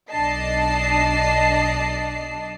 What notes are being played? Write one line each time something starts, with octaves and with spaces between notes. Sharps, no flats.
B1 D4 D5 D#5 A5 C7